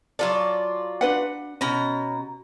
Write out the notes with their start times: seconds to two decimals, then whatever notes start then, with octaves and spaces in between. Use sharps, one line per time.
0.19 F#3 F4 A4 D5
1.01 D4 B4 F#5
1.61 B2 C#4 A#5